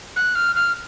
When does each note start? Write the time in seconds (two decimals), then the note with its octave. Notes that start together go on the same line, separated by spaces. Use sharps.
0.16 F#6
0.35 F6
0.55 F6